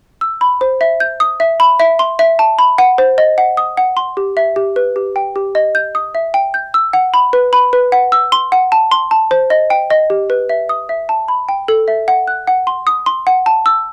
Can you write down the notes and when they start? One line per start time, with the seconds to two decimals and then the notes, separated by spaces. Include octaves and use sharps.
0.21 E6
0.41 B5
0.61 C5
0.81 E5
1.00 G6
1.20 D#6
1.40 E5
1.60 B5
1.80 E5
1.99 C6
2.19 E5
2.39 A5
2.59 B5
2.78 F#5
2.98 C5
3.18 D#5
3.38 F#5
3.57 D#6
3.77 F#5
3.97 C6
4.17 G4
4.37 E5
4.56 G4
4.76 B4
4.96 G4
5.16 G5
5.36 G4
5.55 D#5
5.75 G6
5.95 D#6
6.15 E5
6.34 G5
6.54 G6
6.74 E6
6.93 F#5
7.14 B5
7.33 B4
7.53 B5
7.73 B4
7.92 F#5
8.12 E6
8.32 C6
8.52 F#5
8.72 A5
8.91 C6
9.11 A5
9.31 C5
9.50 D#5
9.70 G5
9.90 D#5
10.10 G4
10.30 B4
10.49 E5
10.69 D#6
10.89 E5
11.09 A5
11.28 B5
11.49 G5
11.68 A4
11.88 E5
12.08 F#5
12.28 F#6
12.47 F#5
12.67 C6
12.87 D#6
13.06 C6
13.27 F#5
13.46 A5
13.66 E6